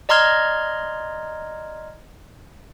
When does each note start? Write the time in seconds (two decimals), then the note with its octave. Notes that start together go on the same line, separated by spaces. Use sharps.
0.09 D5 D#5 A#5 C6 F6 G#6